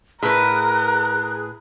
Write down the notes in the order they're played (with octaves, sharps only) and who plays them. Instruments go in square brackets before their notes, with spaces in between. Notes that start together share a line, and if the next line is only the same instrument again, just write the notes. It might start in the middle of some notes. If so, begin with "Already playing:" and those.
[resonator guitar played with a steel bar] A2 B4 [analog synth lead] G#4 [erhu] A#4 [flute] F#6